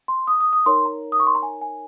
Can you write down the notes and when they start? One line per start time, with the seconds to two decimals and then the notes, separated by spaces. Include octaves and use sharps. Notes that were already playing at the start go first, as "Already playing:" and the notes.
0.08 C6
0.27 D#6
0.40 D#6
0.53 D#6
0.66 D#4 A#4 C#5 C6
0.85 A#5
1.12 D#6
1.20 C#6
1.27 C6
1.35 A#5
1.42 G#5
1.61 G#5